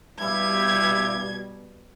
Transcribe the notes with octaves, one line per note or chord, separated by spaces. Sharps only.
G2 B2 G3 E4 G4 G#6